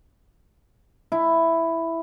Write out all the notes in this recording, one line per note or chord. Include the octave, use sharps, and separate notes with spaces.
E4